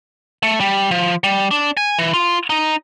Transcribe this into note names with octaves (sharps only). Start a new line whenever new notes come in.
A3
G3
F3
G3
D4
G#5
E3
F4
D#4